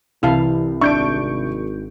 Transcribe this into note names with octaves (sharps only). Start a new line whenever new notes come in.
C2 E3 E4 F5 A5
G#1 D4 E5 C#6 G6 D7